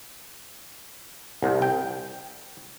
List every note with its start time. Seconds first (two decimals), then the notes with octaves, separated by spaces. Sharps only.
1.42 C2
1.62 G5